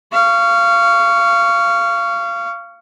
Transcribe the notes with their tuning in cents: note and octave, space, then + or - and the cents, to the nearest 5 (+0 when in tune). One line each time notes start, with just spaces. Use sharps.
F5 -20 C#6 +15